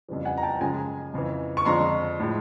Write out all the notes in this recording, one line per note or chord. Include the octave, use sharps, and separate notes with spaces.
F2 C#3 E3 G3
F#5 G#5
A#5
G5 A5
F#2 C#3 F3 G#3 G#5 A#5
F2 C#3 E3
C#6
F2 D3 F3 G#3 A#5 C6
A2 F3 G#3